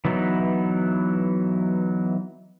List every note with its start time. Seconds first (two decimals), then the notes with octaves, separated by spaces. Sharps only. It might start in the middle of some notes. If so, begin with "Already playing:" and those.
0.05 E3 F#3 B3 D#4 E4